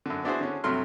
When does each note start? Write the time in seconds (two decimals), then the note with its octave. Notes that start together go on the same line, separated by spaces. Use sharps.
0.06 F#2 D3
0.24 B3 D4 E4 F#4 G#4 C5
0.41 D3 C#4
0.64 G2 C3 F#3 A3 C6 F6